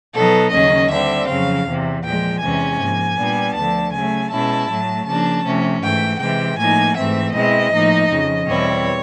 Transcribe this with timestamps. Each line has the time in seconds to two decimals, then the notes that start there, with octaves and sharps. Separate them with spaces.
0.15 B2 F#3 B3 D#4 A4
0.53 D#2 C#3 F#3 A#3 C#4 D#5
0.90 D3 G3 C4 E5
1.29 F2 C#3 F#3 F5
1.67 E2 C3 E3
2.05 A#2 F3 G#3 G5
2.42 E2 C3 E3 G#3 C#4 G#5
2.81 G#2 F3 A#3
3.18 A#2 G3 B3 D4
3.56 D2 D3 F3 A5
3.93 C#3 F#3 A3 G#5
4.31 B2 G#3 C#4 E4 A5
4.69 A2 F#3 A3
5.07 C#3 F3 A#3 D4 A5
5.44 C3 F3 A3 C#4
5.83 G#2 E3 A3 G5
6.21 C3 E3 G#3 G5
6.59 A2 F3 A#3 D#4 G#5
6.96 G#2 E3 A3 C4 E5
7.33 B2 G#3 C4 E4 D#5
7.72 A2 F3 A#3 D#4
8.10 F2 C#3 F3
8.47 E2 B2 G3 C4 E4 C#5